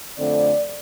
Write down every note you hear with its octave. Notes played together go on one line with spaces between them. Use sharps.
F2 D3 A3 C4 D5